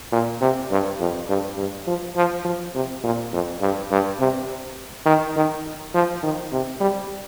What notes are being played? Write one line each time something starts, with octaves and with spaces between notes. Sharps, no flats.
A#2
C3
G2
F2
G2
G2
F3
F3
F3
C3
A#2
F2
G2
G2
C3
D#3
D#3
F3
D#3
C3
G3